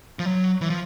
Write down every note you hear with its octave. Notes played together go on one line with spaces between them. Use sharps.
F3
F#3
E3
F3